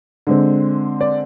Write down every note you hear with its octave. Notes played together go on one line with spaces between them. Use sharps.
D3 G#3 C4
D5